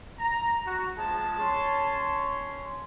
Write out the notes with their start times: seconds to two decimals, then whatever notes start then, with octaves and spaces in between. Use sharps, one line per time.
0.20 A#5
0.67 F#4 A#5
0.98 F3 G#3 G#4 A5
1.41 C#4 C#5 C6